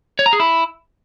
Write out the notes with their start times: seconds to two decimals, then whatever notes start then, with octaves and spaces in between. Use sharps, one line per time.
0.19 C#5
0.26 A#5
0.33 G#4
0.40 E4